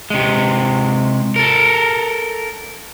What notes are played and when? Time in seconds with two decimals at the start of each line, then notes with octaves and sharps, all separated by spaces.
0.10 C3 G#3
1.36 A4 A#4